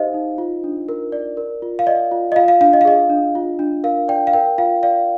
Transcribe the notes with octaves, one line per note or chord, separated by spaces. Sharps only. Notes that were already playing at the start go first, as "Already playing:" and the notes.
Already playing: D#4 G4 C5 D#5 F5
D#4
F4
D4
A#4
D5
A#4
F4
F5
D5 D#5
F4
D#5
F4 F5
F5
D4 F5
D#5
F5
G#4 D#5
D4
F4
D4
A#4 F5
D5 G5
F5
A#4 G5
F4 F5
D5 F5